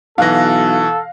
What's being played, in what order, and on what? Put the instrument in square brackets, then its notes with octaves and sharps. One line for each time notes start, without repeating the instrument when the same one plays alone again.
[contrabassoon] B1 [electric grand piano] B2 E3 [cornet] A4 [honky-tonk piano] F5 F#6 A#6